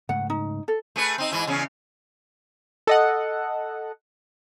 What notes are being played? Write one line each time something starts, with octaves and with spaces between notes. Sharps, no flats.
G#2 C#3 A3 F#5
D#4
A4
A3 G#4 B4
C4 D#4
G#2 E3 E4
E2 C#3 C#4
A4 D#5 F#5